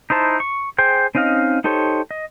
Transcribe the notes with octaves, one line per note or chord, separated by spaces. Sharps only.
D#4 E4 C5 A5
C#6
G#4 C5 G5
C4 C#4 D#4 D#5 F5
D#4 G4 A4 C5 C#5
D#5